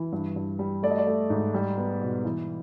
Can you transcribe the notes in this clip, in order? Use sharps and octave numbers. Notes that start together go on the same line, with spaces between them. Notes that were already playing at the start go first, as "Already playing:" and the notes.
Already playing: E3
G2
G2
G3
A3 D5
D#5
D5
A3
G#2
G3
B3
B2
E3